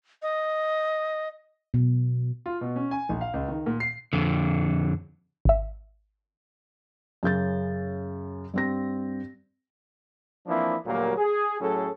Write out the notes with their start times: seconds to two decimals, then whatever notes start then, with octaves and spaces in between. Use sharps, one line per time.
0.22 D#5
1.74 B2
2.46 F4
2.61 B2
2.76 C#4
2.91 G#5
3.09 A#1
3.21 F5
3.34 C#2
3.48 D#3
3.66 A#2
3.80 C7
4.13 F2 D3
5.45 G#1 E5
7.23 F#2 C#3 G6 A6
8.54 G2 C4 A#6
10.47 E3 F3 A#3 C4 D4 E4
10.85 D2 A#2 F#3 G3 A#3
11.17 G#4
11.61 A2 F#3 C#4 G#4 A4